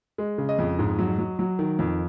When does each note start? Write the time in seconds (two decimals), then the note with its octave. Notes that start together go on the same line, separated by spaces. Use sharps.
0.18 G#3
0.38 C#3
0.49 D#5
0.59 F2
0.79 G#2
0.99 F#3
1.18 F#3
1.39 F#3
1.59 D#3
1.79 F2